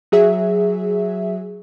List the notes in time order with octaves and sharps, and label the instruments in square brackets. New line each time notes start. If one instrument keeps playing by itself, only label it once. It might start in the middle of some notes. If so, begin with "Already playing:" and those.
[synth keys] F#3 G#4 E5